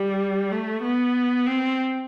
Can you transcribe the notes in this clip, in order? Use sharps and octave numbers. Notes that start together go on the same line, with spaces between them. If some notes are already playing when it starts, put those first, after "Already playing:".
Already playing: G3
A3
B3
C4